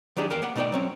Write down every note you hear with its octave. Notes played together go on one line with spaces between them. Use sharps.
D#3 F#3 D4 G4 G#4
E2 A#4 F5 G5
A#3 F#5 B5
B2 A3 D#4 G#4 D5 G5
F#3 C4 C#4